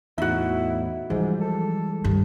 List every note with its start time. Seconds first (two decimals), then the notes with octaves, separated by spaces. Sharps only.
0.18 E2 A2 D#4 E4 F#4
1.10 G#2 E3 F3 G3 G#3
1.41 A4
2.04 G2 D#3